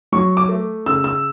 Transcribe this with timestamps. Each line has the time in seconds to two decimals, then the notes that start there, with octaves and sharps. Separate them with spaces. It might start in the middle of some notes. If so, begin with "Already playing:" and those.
0.12 F#3 C#6
0.37 D6
0.49 A3
0.86 C#3 E6
1.04 E6